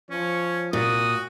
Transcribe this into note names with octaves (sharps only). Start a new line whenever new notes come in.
F3 C#4 C#5
C2 A#2 F#4 D#6